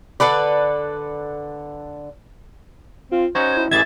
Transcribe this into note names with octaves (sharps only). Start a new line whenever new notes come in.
D3 A4 B4 D5
C4 F4
C#4 D#4 F#4 C5 G#6
E4
A1 E3 G#4 E5 G#6 A6